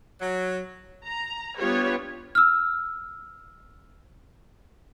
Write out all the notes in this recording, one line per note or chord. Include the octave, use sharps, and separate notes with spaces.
F#3
A#5
G3 B3 D4 F4 G4 C#5
E6 F6